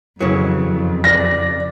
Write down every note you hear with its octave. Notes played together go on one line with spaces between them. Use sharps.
F2 C#3 E3 F#3
D5 A#6